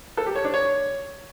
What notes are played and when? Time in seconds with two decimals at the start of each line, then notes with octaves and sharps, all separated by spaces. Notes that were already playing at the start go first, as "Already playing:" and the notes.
0.17 A4
0.26 G4
0.36 C#5
0.45 D4
0.54 C#5